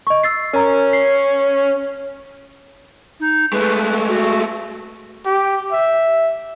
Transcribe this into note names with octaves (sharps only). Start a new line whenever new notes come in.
D#5 C#6
E6 A6 C7
C#4 A#4 A#5
C7
D#4
G#3 A3 B4
F#4
G4
E5